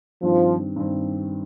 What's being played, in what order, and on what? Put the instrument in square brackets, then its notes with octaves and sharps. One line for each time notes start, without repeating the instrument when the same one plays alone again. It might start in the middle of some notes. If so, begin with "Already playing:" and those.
[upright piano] G2 D#3 C4 [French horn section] F3
[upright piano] G2 D#3 C4